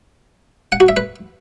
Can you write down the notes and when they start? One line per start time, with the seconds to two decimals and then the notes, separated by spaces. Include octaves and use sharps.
0.72 F#5
0.80 F#4
0.88 E5
0.97 B4